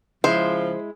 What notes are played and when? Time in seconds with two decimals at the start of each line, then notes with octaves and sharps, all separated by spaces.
0.24 C#3 F3 G#3 E4 C5